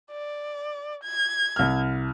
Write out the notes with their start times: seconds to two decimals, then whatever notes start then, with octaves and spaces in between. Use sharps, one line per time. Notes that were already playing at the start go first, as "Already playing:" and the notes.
0.11 D5
1.04 G#6
1.56 C2 F6